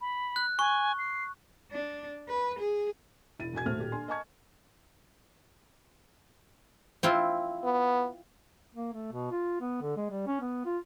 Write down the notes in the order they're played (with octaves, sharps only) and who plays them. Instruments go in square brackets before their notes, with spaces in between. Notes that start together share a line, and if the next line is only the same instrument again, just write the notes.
[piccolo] B5
[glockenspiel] F#6
[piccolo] G#5 [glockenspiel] C#6
[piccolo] C7
[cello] D4
B4
G#4
[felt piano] E1 E4 A6 D#7
E1 F#4 G#5 G#6
D#1 A2 A3 F#4 C5 F6
D#1 A#2 G4
D4 G#5 C6
D#5 G#5 A5 C#6 G#6
[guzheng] C4 E4 F4
[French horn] B3
[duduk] A#3
A3
B2
F4
B3
D3
G#3
G3
C#4
B3
F4